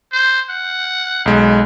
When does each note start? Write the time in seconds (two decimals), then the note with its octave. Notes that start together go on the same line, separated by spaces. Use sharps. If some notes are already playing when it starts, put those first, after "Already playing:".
0.12 C5
0.50 F#5
1.26 B1 G#3